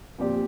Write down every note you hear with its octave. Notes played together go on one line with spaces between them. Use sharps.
A#2 F3 C4 G4 D5